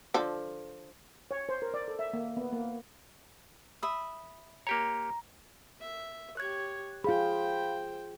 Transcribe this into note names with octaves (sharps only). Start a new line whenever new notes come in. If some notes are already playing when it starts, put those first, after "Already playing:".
D3 F3 A4
C#5
C5
A#4
D5
A4
E5
A#3
B3
A#3
E5 B5 D#6
A#3 G4 C#5 A#5
E5
G4 C#5 F#6 G#6
F4 G#4 C5 F5 G5 B5